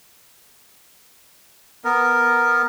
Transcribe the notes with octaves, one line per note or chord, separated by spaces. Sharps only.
B3 A#4